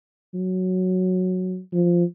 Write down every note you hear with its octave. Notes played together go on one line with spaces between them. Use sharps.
F#3
F3